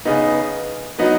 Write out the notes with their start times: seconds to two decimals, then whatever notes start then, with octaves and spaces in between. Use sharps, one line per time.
0.05 C#3 B3 D#4
0.98 F#3 B3 D#4